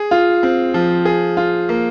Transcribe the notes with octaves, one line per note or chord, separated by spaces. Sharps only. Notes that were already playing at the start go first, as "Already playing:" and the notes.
Already playing: G#4
F4
C4
F3
G#4
F4
A#3